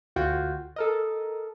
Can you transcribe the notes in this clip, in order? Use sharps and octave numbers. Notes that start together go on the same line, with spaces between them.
D2 F4 F#4 G5
A4 A#4 D#5